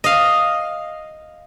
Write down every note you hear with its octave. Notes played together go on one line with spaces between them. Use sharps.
D#5 F5